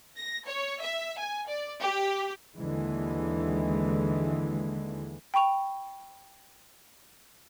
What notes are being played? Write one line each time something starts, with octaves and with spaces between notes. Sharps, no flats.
A#6
C#5
E5
G#5
D5
G4
D#2 D3 E3 G#3
G5 B5 C#6 F7